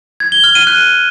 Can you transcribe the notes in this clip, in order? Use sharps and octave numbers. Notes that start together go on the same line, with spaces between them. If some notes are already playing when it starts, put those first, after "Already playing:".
G#6
G7
F6
D#7
F#6